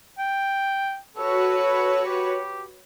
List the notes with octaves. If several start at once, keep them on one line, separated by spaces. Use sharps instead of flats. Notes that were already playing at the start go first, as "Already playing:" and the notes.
G5
F#4 A4 B4 C#5
G4